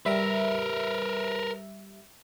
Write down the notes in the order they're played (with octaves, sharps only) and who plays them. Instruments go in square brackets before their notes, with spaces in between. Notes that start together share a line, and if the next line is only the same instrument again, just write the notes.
[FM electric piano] G3 E5 [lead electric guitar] A#4 B4